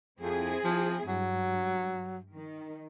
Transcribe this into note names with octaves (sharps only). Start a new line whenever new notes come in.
F2 C4 E4 G#4
F3
G2 F#3
D#3